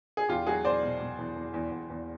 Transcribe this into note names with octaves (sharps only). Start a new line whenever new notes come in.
G#4
E2 F4 G4
F#3 F#4 G#4
E2 C5 D5
B2
B2
E2
E2
E2
E2
E2